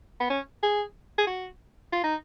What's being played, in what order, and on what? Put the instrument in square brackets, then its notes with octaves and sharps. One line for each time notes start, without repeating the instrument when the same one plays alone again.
[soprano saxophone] B3
C#4
G#4
G#4
F#4
F4
D#4